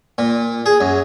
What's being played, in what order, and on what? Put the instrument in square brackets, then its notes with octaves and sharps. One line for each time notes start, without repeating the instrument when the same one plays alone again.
[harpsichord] A#2
G#4
F#2